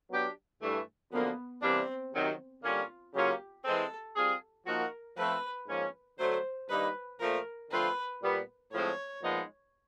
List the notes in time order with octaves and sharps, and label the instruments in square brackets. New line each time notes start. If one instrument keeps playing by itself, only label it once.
[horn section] F#3 B3 D4 G4
G2 E3 A3
[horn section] F#2 D3 F3 A#3 [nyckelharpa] B3
[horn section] C3 E3 G3 A#3 D4 [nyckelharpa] C4
[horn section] C3 D#3 F#3
[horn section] D3 G3 A#3 C#4 [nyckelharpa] F4
[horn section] C#3 F#3 A#3 C#4 F4 [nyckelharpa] G4
[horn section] E3 G#3 C4 [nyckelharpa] A4
[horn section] G3 C4 F4 G#4
[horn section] F3 A#3 D#4 F#4 [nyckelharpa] A#4
[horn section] F3 A3 C4 [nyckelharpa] B4
[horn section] G#2 F3 A#3 C#4
[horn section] D3 F#3 A3 [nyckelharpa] C5
[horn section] G2 D#3 G3 A#3 D#4 [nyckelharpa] B4
[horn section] A#2 F3 A3 [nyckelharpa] A#4
[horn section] D3 F3 A3 C4 F4 [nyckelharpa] B4
[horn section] A#2 G3 B3
[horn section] A2 F3 G#3 C4 [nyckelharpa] C#5
[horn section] A#2 F3 G#3 B3 D#4